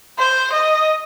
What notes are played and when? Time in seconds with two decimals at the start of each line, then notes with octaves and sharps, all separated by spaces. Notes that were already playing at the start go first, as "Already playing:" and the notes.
0.18 C5
0.52 D#5